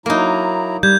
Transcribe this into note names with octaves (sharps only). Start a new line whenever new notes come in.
F#3 A#3 D#4 E4 A#5
G3 G6 G#6